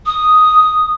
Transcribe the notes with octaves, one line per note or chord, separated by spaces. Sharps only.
D#6